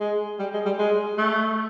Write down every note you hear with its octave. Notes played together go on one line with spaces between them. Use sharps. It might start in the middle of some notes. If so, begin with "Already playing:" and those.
G#3
G3
G#3
G3
G#3
A3